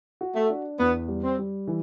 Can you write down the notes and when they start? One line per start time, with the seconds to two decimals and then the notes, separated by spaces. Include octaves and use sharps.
0.21 F#4
0.35 A3
0.50 D4
0.79 E2 B3
1.08 G3
1.23 C4
1.38 G3
1.68 E3